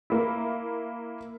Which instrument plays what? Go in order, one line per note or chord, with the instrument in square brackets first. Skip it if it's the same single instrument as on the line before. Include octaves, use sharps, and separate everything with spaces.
[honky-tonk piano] A#3 E4